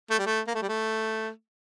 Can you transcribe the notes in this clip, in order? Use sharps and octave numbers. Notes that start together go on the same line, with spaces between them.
A3
G3
A3
A#3
A3
G3
A3